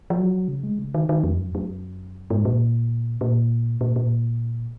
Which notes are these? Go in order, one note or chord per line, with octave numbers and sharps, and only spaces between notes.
F3
F#3
C#3
G#3
C#3
D#3
D#3
F2
F#2
F#2
G#2
A#2
A#2
A#2
A#2